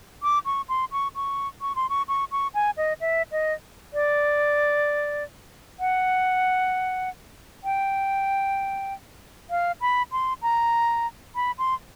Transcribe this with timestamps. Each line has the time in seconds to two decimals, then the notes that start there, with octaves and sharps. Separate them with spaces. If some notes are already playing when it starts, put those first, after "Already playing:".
0.23 D6
0.46 C#6
0.69 C6
0.92 C#6
1.15 C#6
1.61 C#6
1.76 C6
1.89 C#6
2.08 C#6
2.32 C#6
2.54 G#5
2.77 D#5
3.01 E5
3.32 D#5
3.94 D5
5.80 F#5
7.64 G5
9.50 F5
9.81 B5
10.12 C6
10.42 A#5
11.35 B5
11.58 C6